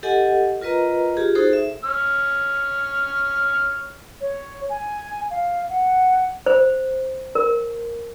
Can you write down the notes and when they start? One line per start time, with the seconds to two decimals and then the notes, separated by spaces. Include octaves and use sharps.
0.03 G4 A4 D#5 F#5 G#5
0.61 F4 A#4 B4 D#5 A#5
1.17 F4 G4 G#4
1.35 D#4 F#4 G#4 A4 C5
1.53 E5
1.84 C#5 F6
4.21 C#5
4.70 G#5
5.30 F5
5.69 F#5
6.46 C5
7.35 A#4